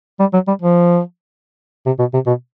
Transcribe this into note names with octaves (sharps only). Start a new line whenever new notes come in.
G3
F#3
G3
F3
C3
B2
C3
B2